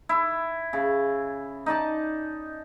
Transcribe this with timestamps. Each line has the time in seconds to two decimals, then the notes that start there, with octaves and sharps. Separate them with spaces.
0.09 E4
0.73 C#3
1.66 D#4 D5 A5